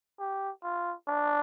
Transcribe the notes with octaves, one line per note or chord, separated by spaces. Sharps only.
G4
F4
D4